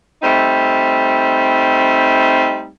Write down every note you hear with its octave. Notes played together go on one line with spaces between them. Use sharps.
G3 A3 C4 D#4